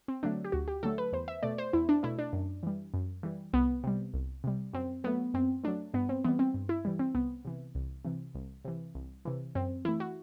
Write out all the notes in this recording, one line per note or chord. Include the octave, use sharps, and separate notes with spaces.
C4
D3 F#3 A3 D4
G4
D2 F#4
G4
D3 F#3 A3 A4
B4
E2 C5
E5
B2 A3 D5
C5
E2 E4
D4
B2 A3 E4
D4
F#2
E3 G3
F#2
E3 G3
C2 B3
C3 G3
C2
C3 G3
F#2 C4
F#3 A3 B3
F#2 C4
F#3 A3 D4
G2 B3
C4
E3 G3 B3
C4
G2
E4
E3 G3
C4
C2 B3
C3 E3
C2
C3 E3
C2
C3 E3
C2
C3 E3
F#2 C4
E3 A3 E4
F#4